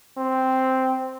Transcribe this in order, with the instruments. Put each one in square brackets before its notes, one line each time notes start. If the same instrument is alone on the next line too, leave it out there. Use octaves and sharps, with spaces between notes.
[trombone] C4